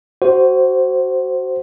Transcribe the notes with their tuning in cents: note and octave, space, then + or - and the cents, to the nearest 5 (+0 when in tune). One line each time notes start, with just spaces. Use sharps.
F#4 +20 C5 +0